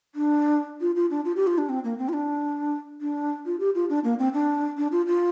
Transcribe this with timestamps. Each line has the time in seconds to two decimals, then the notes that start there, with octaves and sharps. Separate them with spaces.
0.15 D4
0.81 F4
0.96 F4
1.10 D4
1.25 F4
1.36 G4
1.47 F4
1.58 D4
1.69 C4
1.84 A#3
1.98 C4
2.09 F4
2.13 D4
3.01 D4
3.46 F4
3.60 G4
3.75 F4
3.89 D4
4.04 A#3
4.19 C4
4.33 D4
4.77 D4
4.92 F4
5.07 F4